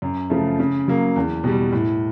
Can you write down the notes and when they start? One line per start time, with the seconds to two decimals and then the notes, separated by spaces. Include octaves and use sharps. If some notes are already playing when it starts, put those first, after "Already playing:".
0.02 F#2
0.30 C#3 F3 A3
0.60 C#3
0.88 F#3 A#3
1.16 E2
1.44 B2 G3
1.72 A2